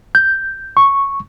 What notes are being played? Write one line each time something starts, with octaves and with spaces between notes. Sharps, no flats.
G6
C#6